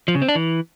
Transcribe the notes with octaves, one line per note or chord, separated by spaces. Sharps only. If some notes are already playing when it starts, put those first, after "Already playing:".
F3
C#3
C4
D4
E3